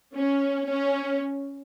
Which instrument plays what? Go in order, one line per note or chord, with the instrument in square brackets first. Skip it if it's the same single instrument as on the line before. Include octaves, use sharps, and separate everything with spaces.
[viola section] C#4
C#4